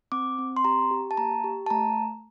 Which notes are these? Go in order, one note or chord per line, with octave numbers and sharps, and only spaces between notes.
C4 D6
C4
C6
G4 A#5
G4
A5
A#3 A#5
G4
A5
A3 A#5